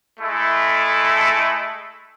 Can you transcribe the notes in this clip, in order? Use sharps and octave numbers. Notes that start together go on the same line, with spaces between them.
G#3 A3 E4 A4